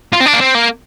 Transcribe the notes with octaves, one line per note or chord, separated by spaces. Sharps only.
F4
C4
D4
A#3
C4
A#3